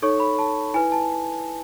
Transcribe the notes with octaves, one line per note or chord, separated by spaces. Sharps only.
D#4 A4 C#5 C#6
B5
A5
E4 B4 G#5
A5